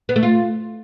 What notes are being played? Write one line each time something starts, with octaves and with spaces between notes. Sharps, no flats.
B3
A3
F4